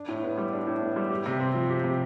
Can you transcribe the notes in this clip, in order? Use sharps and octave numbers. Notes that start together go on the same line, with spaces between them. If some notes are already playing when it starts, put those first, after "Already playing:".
Already playing: D4
A2
B3
G3
D4
A2
B3
G3
G4
C3
C4
F3
G4
C3